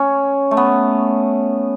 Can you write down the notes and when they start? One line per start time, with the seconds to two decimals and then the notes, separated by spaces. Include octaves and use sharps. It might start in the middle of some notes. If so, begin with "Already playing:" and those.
Already playing: C#4
0.51 A3
0.57 B3